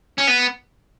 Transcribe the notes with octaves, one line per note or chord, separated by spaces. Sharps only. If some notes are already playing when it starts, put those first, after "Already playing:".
C#4
B3